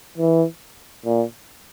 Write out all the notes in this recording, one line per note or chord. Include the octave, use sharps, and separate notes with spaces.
E3
A#2